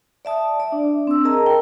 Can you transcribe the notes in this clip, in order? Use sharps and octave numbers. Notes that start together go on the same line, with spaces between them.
D5 E5 A5 D#6
D5 E5
D4
C4 E6
G#4 A#4 D#5 A5 A#5
A#4 G5